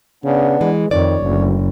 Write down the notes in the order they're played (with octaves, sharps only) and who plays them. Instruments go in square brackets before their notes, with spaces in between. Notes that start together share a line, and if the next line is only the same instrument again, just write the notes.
[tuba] C#3 [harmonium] B3 D4
[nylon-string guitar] E3 [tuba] G#3
[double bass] F2 [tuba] D#3 [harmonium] C#5 [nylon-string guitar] D5
[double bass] F#1 [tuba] D2